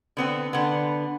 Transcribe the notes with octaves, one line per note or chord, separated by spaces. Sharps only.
D3 B3 C4
D3 B3